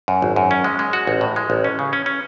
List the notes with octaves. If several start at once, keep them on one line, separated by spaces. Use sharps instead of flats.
F#2
G#1
F#2
C#4
G#3
G#3
F#4
A1
A2
G#3
A1
C#4
C#3
C#4
C#4